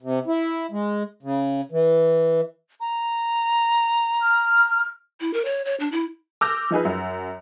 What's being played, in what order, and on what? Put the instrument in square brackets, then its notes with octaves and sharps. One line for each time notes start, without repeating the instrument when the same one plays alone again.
[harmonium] C3
E4
G#3
C#3
E3
[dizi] A#5
[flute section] F6
[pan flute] E4
A#4
C#5
C#5
D4
E4
[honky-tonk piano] D6 E6 F6 G6 A#6
F3 D#4 G#4 B4
F#2